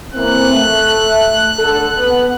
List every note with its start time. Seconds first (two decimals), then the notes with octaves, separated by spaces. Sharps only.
0.14 E3 A#3 C4 F#6
0.50 A3
1.59 D3 A4
1.97 B3